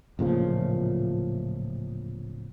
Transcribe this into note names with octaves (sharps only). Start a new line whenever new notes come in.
D1 A#2 C#3 F3